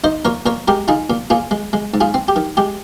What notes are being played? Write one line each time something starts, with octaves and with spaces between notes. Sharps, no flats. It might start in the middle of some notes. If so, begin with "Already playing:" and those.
D#4 C5 D#5
A#2 A#4 C#5
A#2 A#4 C#5
G#3 G4 A#4
D#4 F4 G#4
A#2
A#2 F4 G#4
G#3
G#3
G#2
F4 G#4
C4
G4
D#3
G#3 G4